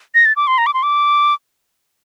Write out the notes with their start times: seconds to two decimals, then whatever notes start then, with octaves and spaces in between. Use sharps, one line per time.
0.15 A#6
0.25 A6
0.36 D6
0.47 C6
0.58 A#5
0.66 D6
0.74 C6
0.83 D6